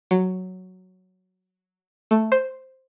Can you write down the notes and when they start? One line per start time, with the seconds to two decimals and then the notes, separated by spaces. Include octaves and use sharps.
0.11 F#3
2.11 A3
2.32 C5